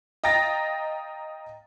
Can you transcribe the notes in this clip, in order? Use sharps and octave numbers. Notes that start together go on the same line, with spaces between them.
D#5 F5 G5 A#5 A6 A#6